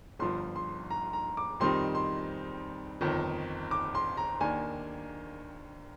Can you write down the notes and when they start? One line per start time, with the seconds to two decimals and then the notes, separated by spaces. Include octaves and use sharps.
0.19 G1 G2 F3 C6
0.55 C6
0.91 A#5
1.13 A#5
1.37 D6
1.60 F2 D#3 G3 C4 D#4 C6
1.95 C6
3.01 G1 F2 D#3
3.71 D6
3.95 C6
4.17 A#5
4.41 D#2 D#3 A#3 D4 G#5